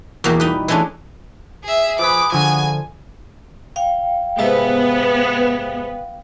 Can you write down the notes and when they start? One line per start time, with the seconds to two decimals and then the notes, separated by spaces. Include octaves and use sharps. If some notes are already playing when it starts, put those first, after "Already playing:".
0.24 E2 B2 A#3 F#4 G4
0.40 G3 D#4 B4
0.68 E3 G#3 A3 C#4 D4
1.64 G#4 E5
1.99 F3 G#4 B4 D6 B6
2.32 D3 F3 B3 F#4 G#4 G#5
3.76 F5 G5
4.39 G#2 C3 B3 B4 E5